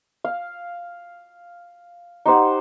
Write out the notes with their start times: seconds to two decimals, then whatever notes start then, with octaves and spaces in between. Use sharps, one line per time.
0.24 F5
2.26 D#4 G4 C5 F#5